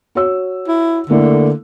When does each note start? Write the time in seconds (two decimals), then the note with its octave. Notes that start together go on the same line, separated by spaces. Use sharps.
0.15 F#4 C#5 E6
0.68 E4
1.10 D3 A3 A#3 E4